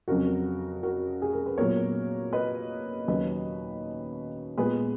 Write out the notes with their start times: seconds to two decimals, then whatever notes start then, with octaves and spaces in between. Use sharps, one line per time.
0.08 F2 C#3 F#3 F#4 A#4
0.83 F#4 A#4
1.22 G#4
1.33 A#4
1.46 B4
1.58 A#2 F#3 B3 A#4 C#5
2.33 B4 D#5
3.08 D#2 C#3 F#3 B4 D#5
4.58 A#2 G#3 B3 G#4 B4